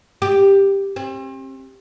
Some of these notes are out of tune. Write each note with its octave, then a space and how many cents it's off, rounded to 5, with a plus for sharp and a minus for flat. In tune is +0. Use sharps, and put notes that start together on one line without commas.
G4 +5
C4 +40